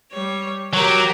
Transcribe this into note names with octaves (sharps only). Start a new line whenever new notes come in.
G3 C#5
F#3 G4 A#4 G5